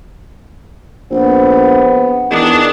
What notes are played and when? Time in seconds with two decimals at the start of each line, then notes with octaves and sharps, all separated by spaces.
1.11 A#1 B3 C4
2.31 E2 D#3 G#3 D4